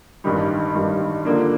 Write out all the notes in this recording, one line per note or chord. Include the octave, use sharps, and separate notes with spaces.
A1 G2 D#3 G3
A1 G2 D#3 G3
D3 F3 A#3 D4